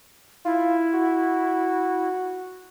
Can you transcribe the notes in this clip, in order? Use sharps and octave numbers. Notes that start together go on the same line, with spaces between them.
E4 F4
F#4